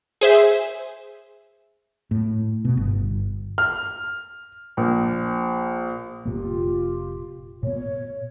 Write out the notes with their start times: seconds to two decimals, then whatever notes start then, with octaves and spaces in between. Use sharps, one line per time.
0.21 G#4 C5 E5
2.11 A2
2.65 B2
2.77 G1
3.58 F6
4.77 A#1
6.26 F1 A#2 A#3 F4 G4
7.63 A#2 B3 C#5